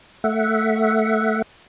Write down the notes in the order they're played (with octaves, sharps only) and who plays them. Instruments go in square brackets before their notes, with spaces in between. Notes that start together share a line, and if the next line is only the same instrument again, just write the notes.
[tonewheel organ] A3 E5 F#5